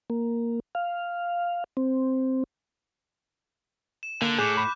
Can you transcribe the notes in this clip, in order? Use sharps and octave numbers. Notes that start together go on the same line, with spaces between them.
A#3
F5
C4
E7
D3 A#3
A2 G#4 D6 F#6 G6
B5